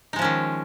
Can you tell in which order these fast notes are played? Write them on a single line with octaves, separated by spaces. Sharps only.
D#4 G#3 F3 C#4 D#3